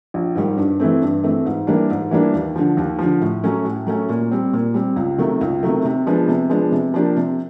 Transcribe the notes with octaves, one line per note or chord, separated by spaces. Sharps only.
A#1
G#2 D#3 G3
G2
E3 A3 C4
G2
E3 A3 C4
G#2
E3 G3 A#3 D4
G#2
E3 G3 A#3 D4
D#2
D3 F3
D#2
D3 F3
A2
F#3 A3 C#4
A2
F#3 A3 C#4
A#2
G3 C4
A#2
G3 C4
C#2
C3 D#3 F#3 A3
C#2
C3 D#3 F#3 A3
C3
F3 G#3 B3 D4
C3
F3 G#3 B3 D4
C3
F3 A#3 D4 G4
C3